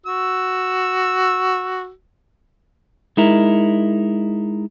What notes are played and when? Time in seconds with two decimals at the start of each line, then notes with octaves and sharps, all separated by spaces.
0.06 F#4 E6
3.17 G#3 D#4 E4 A#4